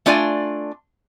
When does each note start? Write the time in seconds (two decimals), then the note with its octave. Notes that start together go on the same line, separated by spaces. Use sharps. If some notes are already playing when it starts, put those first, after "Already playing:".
0.06 A3 D4 F4 D5 D#5 G#5